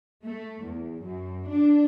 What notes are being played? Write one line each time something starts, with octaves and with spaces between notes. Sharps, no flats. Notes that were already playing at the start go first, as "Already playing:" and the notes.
A3
E2
F#2
D4